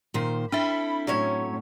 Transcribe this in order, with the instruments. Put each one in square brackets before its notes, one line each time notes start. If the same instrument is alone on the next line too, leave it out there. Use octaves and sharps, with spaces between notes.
[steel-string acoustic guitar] A#2 D#3 C5
[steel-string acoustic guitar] C4 E4 A4 [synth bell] D4 E5 [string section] B5
[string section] A2 [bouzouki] F#3 C#4 C#5